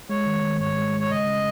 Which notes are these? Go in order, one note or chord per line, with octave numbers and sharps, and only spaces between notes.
G#3 C#5
D#3
D#3
G#2 C#5
G#3
G#3
C#5
C#3 D#5
C#3